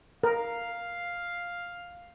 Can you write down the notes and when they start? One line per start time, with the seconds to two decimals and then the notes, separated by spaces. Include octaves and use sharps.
0.23 A#4 F5